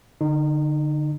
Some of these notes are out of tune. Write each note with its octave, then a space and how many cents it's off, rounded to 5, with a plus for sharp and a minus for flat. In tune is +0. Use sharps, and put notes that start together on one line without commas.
D3 +0 D#4 -20